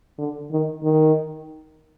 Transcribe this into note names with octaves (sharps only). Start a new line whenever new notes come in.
D3
D#3
D#3